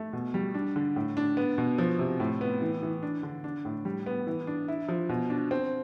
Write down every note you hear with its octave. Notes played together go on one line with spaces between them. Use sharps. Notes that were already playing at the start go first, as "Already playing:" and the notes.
Already playing: A3
B2
G3
D4
D3
A2
D4
B3
B2
F3
C3
A2
B3
E3
E3
D4
D3
D4
A2
G3
B3
E3
D4
E4
F3
B2
D4
C4